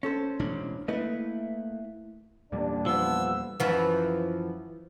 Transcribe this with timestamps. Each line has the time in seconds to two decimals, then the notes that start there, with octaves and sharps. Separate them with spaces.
0.03 C#4 A4 C5
0.39 E1 A1 D4
0.88 A3 A#3 E4 B4 D#5
2.52 E2 A#2 G3 D4
2.86 F3 B3 E6
3.60 F#2 E3 F3